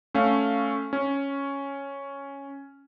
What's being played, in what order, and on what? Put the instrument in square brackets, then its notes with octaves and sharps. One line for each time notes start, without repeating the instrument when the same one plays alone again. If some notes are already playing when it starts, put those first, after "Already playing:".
[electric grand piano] A3 C#4 F5
C#4